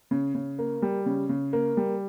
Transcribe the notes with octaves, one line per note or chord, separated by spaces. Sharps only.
C#3
C#3
A#3
G3
C#3
C#3
A#3
G3